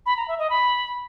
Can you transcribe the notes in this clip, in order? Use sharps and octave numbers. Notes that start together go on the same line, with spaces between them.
B5
A#5
E5
D#5
B5